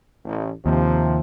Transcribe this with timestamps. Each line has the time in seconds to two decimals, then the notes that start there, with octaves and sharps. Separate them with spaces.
0.25 A1
0.66 D#2 C3 F3